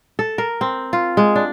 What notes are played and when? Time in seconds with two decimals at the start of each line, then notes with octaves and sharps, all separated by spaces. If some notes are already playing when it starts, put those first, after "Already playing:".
0.19 A4
0.38 A#4
0.61 C4
0.93 F4
1.17 G#3
1.35 D4